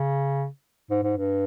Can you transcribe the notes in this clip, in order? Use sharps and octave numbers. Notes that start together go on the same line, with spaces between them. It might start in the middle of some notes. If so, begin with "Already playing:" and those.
Already playing: C#3
G#2
G#2
G2